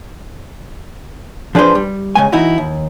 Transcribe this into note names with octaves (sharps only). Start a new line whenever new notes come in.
F3 D4 G#4 B4 C5
G3
C#3 G#3 G#5
E3 D#4 E4 F#4
D#2